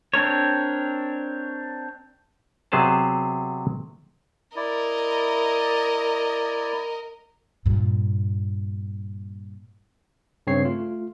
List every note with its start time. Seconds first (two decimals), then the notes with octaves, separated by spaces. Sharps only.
0.14 C4 D4 A#4 C#5
2.72 C3 F#3 B3 G#4 C5 A5
4.56 E4 A#4 D5 D#5
7.66 G2 A#2
10.47 G2 C#3 C4 C#5 C7
10.65 A3 F4